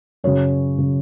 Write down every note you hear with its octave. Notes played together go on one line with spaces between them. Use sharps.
F#2 C#3 C#5
C#3